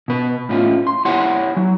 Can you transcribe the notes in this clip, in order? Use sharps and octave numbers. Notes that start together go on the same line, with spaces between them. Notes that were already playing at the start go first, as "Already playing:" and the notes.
B2 B4
A2 C#4 F4
C6
E4 G4 C#5 F#5 G#5 C6
F#3